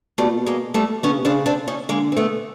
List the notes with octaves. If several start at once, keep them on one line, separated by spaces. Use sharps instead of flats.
B2 G3 A3
A#2
B2
G#3 A#3
G3 A3
D3 B3 C#4
C#3
C3
C#3 C4 D4
C4 D4
C#4 D#4
D3 G#3 A#3
C4
A3 B3